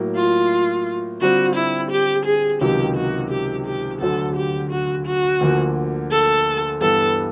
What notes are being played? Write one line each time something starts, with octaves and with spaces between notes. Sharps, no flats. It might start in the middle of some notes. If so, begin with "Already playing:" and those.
Already playing: A2 F#3 A#3
F4
D3 G3 C4 F4 F#4
E4
G4
G#4
C#2 C3 D#3 F#3 G4
F#4
G4
G4
D2 D3 F#3 A4
G4
F#4
F#4
D2 D3 F3 A#3
A4
G2 E3 G3 B3 A4